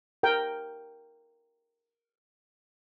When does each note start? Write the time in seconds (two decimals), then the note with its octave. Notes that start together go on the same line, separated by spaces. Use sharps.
0.23 A#4 G5